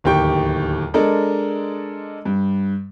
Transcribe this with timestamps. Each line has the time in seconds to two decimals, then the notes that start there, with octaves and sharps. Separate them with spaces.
0.04 D1 D#2 G4 G5 C#6
0.94 G#3 D4 A4 A#4 D#5
2.25 G2